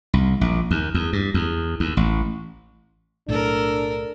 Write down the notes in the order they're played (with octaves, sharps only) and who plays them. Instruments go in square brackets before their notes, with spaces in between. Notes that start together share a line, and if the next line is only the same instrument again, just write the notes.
[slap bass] C2
A#1
D#2
E2
G2
E2
D#2
A1
[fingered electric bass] B1 A2 [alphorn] D4 [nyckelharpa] A4 A#4